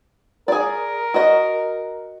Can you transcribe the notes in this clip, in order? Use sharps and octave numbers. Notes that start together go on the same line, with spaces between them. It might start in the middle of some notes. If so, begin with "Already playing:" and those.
G#4 A#4 D5
F#4 D#5